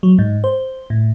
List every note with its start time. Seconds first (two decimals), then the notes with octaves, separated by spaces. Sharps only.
0.03 F#3
0.19 G#2
0.44 C5
0.90 A2